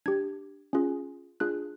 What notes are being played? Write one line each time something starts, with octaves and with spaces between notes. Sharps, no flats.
D4 G4 G#6
C#4 F4 G#4
D4 F4 G#4 F#6